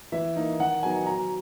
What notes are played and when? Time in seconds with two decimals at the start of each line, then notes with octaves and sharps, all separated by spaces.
0.12 E3 E5
0.36 A#3 D#4
0.60 D#3 F#5
0.83 F#3 B3 D#4 G#5
1.06 F#3 A#5